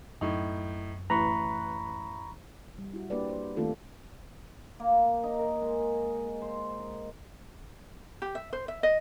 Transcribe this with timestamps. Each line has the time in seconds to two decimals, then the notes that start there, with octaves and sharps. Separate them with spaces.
0.21 F#2 A2 D#4
1.10 A1 B4 A#5 B5 C#6
2.78 G3
2.93 E4 F#4
3.10 A#3 D4 G4 B4 D5
3.29 C5
3.57 D#3 A3 A#3 C4 F4 A4
4.80 A#3
5.24 D#4
5.39 A#4
5.62 G#3
6.41 C5
8.22 G4
8.35 E5
8.53 C5
8.68 E5
8.83 D#5